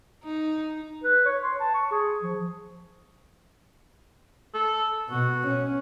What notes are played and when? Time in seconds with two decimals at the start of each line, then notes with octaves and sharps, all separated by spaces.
0.24 D#4
1.04 B4
1.25 C#5
1.43 C6
1.60 A5
1.74 C#6
1.92 G#4
2.23 F3
4.54 A4
5.10 B2 F#4
5.47 C#4